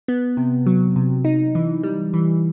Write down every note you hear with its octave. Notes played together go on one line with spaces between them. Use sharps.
B3
C3
F#3
C3
D#4
E3
G3
E3